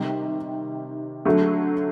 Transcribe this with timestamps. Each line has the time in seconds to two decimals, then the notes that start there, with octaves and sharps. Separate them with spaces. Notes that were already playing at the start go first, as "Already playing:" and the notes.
Already playing: C3 D#3 G3
1.25 D3 F#3 A3